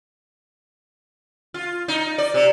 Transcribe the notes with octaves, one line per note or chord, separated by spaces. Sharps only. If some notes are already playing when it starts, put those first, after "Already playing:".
F4
D#4
D5
C3